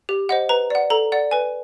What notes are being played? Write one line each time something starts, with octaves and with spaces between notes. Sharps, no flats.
G4
C5 D#5 F#5
B4 A#5
D5 F#5
A4 A#5
D5 F#5
B4 G#5